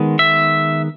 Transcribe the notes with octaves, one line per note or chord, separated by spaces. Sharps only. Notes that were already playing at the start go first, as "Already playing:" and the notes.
Already playing: D#3 G#3 B3
E5